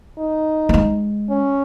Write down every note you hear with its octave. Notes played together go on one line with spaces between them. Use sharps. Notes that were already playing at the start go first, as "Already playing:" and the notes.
D#4
A#3
G#3
C#4